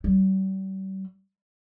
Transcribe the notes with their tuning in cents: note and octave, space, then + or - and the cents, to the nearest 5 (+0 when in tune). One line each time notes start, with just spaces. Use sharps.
G3 -40